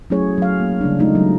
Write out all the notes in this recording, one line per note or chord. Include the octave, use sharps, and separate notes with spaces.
F#3 A3 C#4 E4 G#4 C#5
F#3 F5
A#3
C#3 G3 C#4 D4
D#3 G#3 A3 D#4 F4
F#3